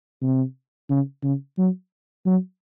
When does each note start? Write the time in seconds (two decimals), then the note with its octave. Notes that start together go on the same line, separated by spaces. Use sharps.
0.21 C3
0.90 C#3
1.23 C#3
1.58 F#3
2.26 F#3